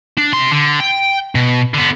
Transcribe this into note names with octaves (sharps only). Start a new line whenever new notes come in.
D4
C3 C6
D3
G5
B2
D3 B3